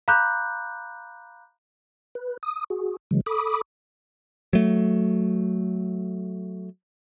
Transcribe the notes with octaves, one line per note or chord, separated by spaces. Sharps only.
F5 A#5 B5 D6 F#6 G6
B4
D#6
F#4 G#4
C#3 E3 F#3 G#3
A4 B5 D6 D#6
F#3 A3